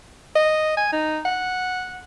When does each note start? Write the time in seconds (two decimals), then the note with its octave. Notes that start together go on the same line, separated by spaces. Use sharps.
0.35 D#5
0.77 G#5
0.92 D#4
1.25 F#5